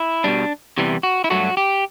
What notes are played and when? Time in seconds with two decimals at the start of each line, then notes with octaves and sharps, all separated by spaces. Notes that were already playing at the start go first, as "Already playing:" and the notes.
Already playing: E4
0.24 B2 G3 D4
0.78 E2 C3 E3 G3
1.03 F#4
1.24 E4
1.30 G2 F#3 A3 F#4
1.57 G4